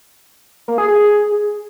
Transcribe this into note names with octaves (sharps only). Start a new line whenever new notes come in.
A#3
G#4
G#4